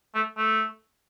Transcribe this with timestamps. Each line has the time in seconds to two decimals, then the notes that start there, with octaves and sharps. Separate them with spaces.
0.15 A3
0.37 A3